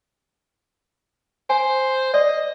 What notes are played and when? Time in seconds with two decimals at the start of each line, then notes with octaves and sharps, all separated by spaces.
1.50 C5 G#5
2.14 D5 D#5